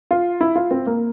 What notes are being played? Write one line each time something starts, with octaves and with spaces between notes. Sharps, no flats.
F4
E4
F4
C4
A#3